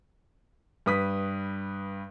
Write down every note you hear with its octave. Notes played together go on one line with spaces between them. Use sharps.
G2 B4 D#6 B6